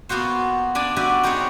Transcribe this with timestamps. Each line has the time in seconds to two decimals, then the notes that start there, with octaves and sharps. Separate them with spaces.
0.09 A#3 B3 F4 F#4 C5
0.75 D4 D5 G#5
0.96 F#4 G4 B4 D5 E5 G#5
1.23 C4 D#4 F#4 G#4 C#5